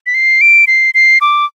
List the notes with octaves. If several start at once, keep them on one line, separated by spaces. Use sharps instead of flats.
B6
C7
D7
C7
C7
D6